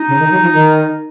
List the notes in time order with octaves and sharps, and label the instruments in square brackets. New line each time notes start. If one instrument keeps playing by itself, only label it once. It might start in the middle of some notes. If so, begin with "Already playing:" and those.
Already playing: [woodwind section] D#4
[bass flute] C#3
D#3
F#3
F3
D#3